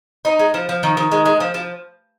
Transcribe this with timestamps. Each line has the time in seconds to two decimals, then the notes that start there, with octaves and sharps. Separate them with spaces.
0.25 D#4
0.39 G#3
0.54 F3
0.69 F3
0.83 D#3
0.97 D#3
1.12 G#3
1.25 G#3
1.40 F3
1.54 F3